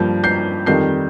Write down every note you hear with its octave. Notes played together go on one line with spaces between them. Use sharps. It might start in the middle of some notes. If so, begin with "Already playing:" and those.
Already playing: G2 F3 A#3 G6
G6 C7
F2 D#3 G3 G6 C7